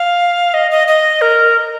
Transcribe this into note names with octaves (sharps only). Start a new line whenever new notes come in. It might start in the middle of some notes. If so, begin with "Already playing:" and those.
Already playing: F5
D#5
D#5
D#5
A#4